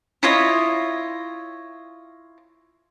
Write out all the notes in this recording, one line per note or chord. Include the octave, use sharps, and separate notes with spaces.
E4 F4 C#5 D#5